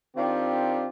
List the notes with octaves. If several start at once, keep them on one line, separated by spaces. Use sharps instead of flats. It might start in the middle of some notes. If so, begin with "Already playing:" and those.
D#3 C4 D4 F4 G4